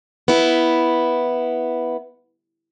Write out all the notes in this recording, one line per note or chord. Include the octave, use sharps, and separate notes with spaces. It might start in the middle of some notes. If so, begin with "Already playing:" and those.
B3 E4